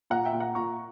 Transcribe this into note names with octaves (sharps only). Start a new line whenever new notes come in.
A#2 F#5 A#5
E5 G5
A#2
F#5 A#5
A#2 A#5 C#6